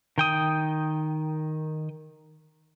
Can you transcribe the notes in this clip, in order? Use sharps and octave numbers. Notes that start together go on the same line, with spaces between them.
D#3 G5 D#6